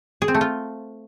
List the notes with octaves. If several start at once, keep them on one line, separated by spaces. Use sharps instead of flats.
G#4
C4
A3
F4